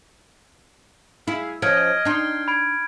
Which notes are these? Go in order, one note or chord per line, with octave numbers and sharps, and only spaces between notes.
E4 G#4 F5
F3 C#4 D#5 F6 G#6 D7
D4 D#4 G5 C6
B5 G#6 D7